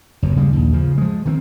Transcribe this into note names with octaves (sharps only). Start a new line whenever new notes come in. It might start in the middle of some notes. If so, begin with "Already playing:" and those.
F#1 F#2
C#3 G3 G#3
A#1 D#2
C#3 F3
F3 G#3
D#3 A#3 C4